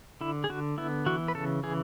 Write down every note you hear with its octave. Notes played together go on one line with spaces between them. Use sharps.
D3 E4
G#4
D3 F#4
B3 E4
E3 F#4
B4
C#3 A4
E3 G#4